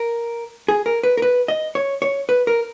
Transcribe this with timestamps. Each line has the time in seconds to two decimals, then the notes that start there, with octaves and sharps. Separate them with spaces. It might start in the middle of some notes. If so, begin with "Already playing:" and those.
Already playing: A#4
0.68 G#4
0.86 A#4
1.03 B4
1.17 A#4
1.22 B4
1.48 D#5
1.75 C#5
2.02 C#5
2.29 B4
2.47 A#4